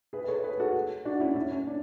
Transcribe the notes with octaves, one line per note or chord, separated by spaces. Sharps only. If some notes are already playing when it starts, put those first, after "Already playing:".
G#4 B4
B4
A4 C#5
G#4 B4
F#4 A4
D4 F#4
C#4 E4
C#4 E4
C#4
D4